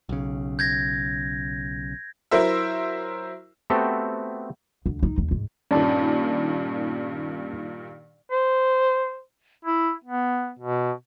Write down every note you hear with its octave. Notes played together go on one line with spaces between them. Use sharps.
B1 C#3
G6 G#6 A#6
F#3 E4 A#4 C5 E5
A3 B3 C4 F#4 G4 A4
D2
D#4
D#2
G#2
G2 A#2 D#3 C#4 D5 A5
C5
E4
B3
B2